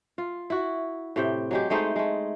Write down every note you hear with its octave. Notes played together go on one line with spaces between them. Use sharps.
F4
E4 F#4
A2 C3 G5
F#3 G#3 G4
G#3 A3 D#4 C5
G#3 A3